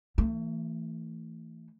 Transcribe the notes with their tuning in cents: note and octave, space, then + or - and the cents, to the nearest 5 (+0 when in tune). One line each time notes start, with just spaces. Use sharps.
E3 +0 A3 +40